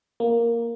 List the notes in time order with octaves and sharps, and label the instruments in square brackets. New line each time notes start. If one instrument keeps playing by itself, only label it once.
[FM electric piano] A#3